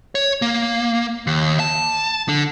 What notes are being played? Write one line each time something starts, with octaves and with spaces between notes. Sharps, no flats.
C#5
A#3
D#2
A5
D3